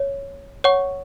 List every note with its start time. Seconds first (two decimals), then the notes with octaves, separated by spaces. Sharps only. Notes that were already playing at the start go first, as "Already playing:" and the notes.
Already playing: C#5
0.64 C#5 F#5 C#6